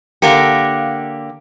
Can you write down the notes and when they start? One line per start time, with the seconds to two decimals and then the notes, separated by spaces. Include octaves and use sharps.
0.22 D3 A#3 G4 F5 F#5 C#7